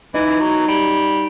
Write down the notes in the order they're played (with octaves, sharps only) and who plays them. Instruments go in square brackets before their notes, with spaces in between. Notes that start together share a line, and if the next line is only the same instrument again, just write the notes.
[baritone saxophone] E3 [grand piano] D#4
[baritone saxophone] F#3
G3